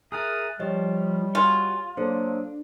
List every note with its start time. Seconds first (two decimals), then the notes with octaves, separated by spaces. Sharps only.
0.12 G#4 A#4 E5 A#5 D#6 F6 F#6 A6
0.59 F3 G3 G4 C#5 D#5
1.35 F4 F#4 G#5 C#6
1.97 F#3 A#3 D4 A4 C5